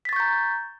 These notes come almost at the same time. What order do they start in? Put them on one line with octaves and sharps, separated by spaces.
B6 A6 C#6 G6 A#5